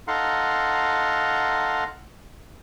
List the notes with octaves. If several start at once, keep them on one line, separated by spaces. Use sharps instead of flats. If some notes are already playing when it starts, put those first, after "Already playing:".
D#4 A4 F5 F#5 A#5 C6